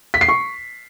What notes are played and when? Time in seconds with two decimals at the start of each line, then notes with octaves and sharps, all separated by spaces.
0.14 B6
0.21 C7
0.28 C#6